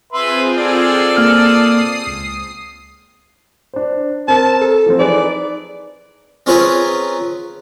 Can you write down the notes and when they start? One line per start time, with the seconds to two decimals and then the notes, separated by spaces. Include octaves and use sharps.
0.13 C4 F4 G#4 B4 E5 C6
0.58 A4 D5
1.17 A#3 D#6 F6 C7
2.07 C#2
3.74 D4 C5
4.28 C4 A#4 A5
4.62 A4
4.86 E3 F3 C4
4.99 D#4 G#4 B4 D5
6.46 C4 C#4 F4 G#4 A#4 B4